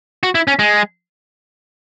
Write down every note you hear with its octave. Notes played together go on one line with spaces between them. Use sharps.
F#4
E4
C#4
G#3